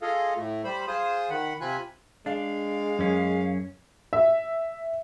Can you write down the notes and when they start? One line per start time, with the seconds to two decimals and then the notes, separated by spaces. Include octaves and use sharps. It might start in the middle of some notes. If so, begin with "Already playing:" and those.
0.02 F4 G#4 A4 D#5 F5
0.37 A2 A3
0.64 G3 C5 B5
0.88 F4 G#4 C5 D#6
1.30 D#3 F#5 B5
1.61 C3 C4 F4 G#5 B5 F#6
2.26 G#3 D4 F5
2.99 F#2 C#4 G#4
4.13 E5